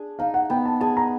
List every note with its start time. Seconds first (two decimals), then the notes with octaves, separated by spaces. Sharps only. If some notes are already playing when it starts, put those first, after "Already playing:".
Already playing: D4 G#4
0.19 D#4 F5
0.34 F#5
0.50 B3 G5
0.65 A5
0.81 G#4 A5
0.97 A#5